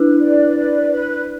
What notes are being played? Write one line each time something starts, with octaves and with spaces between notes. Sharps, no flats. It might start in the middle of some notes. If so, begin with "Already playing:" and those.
Already playing: D4 E4 B4
D5
B4
B4